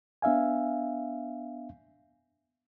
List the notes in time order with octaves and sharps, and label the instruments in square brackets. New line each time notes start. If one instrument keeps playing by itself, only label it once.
[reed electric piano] B3 D4 E5 F5 G#5